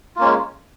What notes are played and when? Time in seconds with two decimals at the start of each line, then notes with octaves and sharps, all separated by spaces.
0.16 F4
0.19 A#3
0.21 C#4
0.24 G#3